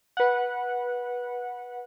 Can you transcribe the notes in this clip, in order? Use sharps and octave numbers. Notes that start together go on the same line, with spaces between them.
B4 F#5